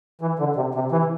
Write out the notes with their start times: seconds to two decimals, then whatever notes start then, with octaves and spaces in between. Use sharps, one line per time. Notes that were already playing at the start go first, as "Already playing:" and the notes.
0.21 E3
0.39 D3
0.56 C3
0.75 C3
0.92 E3